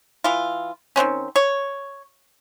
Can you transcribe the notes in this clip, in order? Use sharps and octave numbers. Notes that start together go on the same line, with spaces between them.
E3 F4
D#3 E3 C4 C#4
C#5